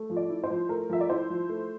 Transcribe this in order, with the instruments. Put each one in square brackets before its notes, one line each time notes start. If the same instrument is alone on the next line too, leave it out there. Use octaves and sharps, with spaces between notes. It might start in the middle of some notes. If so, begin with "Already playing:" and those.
Already playing: [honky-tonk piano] A3
F3
D5
E4
C5
F3
A3 A#4
F3 E5
D5
E4 C5
F3
A3